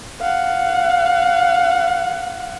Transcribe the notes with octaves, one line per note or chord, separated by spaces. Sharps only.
F5 F#5